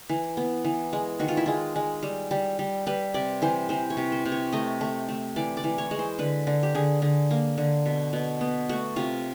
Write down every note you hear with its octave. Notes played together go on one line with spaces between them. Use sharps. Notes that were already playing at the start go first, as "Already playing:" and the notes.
E3
B3
E3
G#3
D#3 F#4
F4
E4
G#3 F4
G#3
G3
G3
G3
G3 B4
C3 D5
E3 C5
E3 C5
C#5
C3
C5
C3
C#5
A3 D#5
A3
A3
E3 D5
D5
E3
C#5
G#3
C5
D3 B4
D3
G4
D3 G#4
D3
A#3
D3
B2
B2
B3
A3 F#4
C3 F4